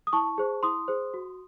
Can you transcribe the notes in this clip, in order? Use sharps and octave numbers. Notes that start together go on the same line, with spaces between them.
D#6
E4 A5 C#6
G#4 C5
E4 C6 D#6
G#4 C5
F#4